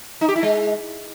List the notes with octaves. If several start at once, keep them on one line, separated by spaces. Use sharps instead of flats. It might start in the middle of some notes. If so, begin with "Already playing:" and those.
D#4
G4
E4
G#3